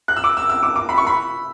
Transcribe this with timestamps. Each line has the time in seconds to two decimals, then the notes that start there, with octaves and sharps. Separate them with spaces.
0.08 F#6
0.16 E6
0.24 D6
0.37 E6
0.49 E6
0.63 D6
0.76 D6
0.89 B5
0.98 C#6
1.07 B5